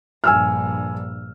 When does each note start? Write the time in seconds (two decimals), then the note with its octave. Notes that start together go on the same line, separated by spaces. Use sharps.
0.24 A#1 G2 G#5 E6 F6